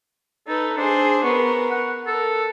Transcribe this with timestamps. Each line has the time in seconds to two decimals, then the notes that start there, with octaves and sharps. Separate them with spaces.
0.48 D#4 A4 B4
0.77 D4 G#4 C5
1.24 B3 A#4 C#6
1.71 F#5
2.07 A4 A#4